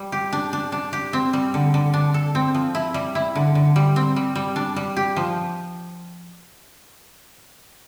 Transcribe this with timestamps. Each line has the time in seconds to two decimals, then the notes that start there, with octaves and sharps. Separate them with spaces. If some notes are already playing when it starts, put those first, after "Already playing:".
Already playing: G3
0.12 G4
0.33 D4
0.53 D4
0.72 D4
0.93 G4
1.13 C4
1.33 G3
1.54 D3
1.74 D3
1.94 D4
2.14 A4
2.35 C4
2.54 F3
2.75 E4
2.94 G3
3.15 E4
3.35 D3
3.55 D3
3.76 G3
3.96 C4
4.16 G3
4.35 G3
4.56 D4
4.76 G3
4.96 G4
5.16 F3